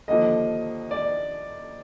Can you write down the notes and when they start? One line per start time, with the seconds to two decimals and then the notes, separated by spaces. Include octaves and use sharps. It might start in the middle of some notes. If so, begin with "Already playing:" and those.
0.08 D#2 D3 F3 D#5
0.91 D5